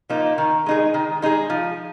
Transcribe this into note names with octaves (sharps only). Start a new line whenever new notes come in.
F3 A#3 D#4
D#3
G#3 D#4 G#4
D#3
G#3 D#4 G#4
F3